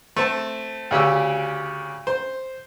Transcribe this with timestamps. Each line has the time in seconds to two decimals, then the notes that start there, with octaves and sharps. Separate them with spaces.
0.16 A3 C4 A5
0.91 D2 C#3 G4 E6
2.07 C5